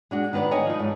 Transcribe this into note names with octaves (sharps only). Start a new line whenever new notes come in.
G#3 D4 F#4
D#3 B3 B4 C5 D5
C#5 D#5 G#5
F3 D#4
G#2